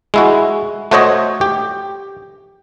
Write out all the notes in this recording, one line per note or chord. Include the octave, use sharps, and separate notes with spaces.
G#3 E4 F#4
A3 F#4 C5 C#5 D#5
G4